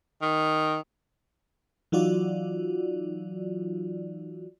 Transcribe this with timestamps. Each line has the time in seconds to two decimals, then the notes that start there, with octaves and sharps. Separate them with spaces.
0.22 D#3
1.92 E3 F#3 D#4 F4 F#4 D5